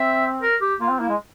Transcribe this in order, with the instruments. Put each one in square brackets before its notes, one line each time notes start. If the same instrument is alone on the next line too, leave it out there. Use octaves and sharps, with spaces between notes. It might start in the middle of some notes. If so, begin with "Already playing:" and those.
Already playing: [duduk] C4 [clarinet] E5
[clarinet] A#4
G4
[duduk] A#3 [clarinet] F4
[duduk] C4
[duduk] A#3 [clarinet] E4
[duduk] G#3